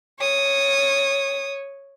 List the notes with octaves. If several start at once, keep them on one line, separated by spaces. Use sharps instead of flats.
C#5 D#6